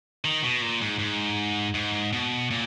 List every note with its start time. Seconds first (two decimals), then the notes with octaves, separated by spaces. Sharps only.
0.25 D#3
0.43 B2
0.62 A#2
0.81 G#2
0.99 G#2
1.75 G#2
2.13 B2
2.51 A#2